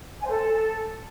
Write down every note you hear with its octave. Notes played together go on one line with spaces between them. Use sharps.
G#5
C5
A4